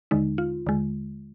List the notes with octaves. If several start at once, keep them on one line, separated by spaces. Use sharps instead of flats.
D#2 D3 G#3 D#4
F4
D#2 D3 G#3